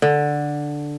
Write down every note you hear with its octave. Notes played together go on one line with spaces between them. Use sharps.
D3